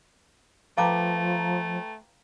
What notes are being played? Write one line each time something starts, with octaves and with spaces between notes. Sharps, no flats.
F3 A3 B4 F5 G5 A5 A#5 D6